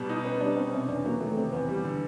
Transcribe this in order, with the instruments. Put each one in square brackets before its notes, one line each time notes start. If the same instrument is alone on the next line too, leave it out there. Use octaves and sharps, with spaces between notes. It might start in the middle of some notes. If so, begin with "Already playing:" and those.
Already playing: [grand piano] B2 G3
D#4
[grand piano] B3 [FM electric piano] C#4
[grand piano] G3 [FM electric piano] D4
[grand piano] B2 [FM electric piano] C4
[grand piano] C3 [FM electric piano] C#4
[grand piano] E2 [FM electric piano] D4
[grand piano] F#3 [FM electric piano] A#3
[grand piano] D#3 [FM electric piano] A3
[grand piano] C3 [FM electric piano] C4
[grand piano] E2 [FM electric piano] B3
[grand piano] G3
D3